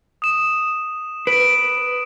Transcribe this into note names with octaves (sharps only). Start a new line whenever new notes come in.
D#6 E7
B4 D7